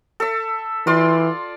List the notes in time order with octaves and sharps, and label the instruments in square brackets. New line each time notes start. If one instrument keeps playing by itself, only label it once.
[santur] A4 E5
[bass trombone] E3 [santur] F4 D5 C6